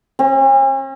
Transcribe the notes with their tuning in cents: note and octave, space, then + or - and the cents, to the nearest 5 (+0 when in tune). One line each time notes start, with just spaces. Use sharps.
C#4 -45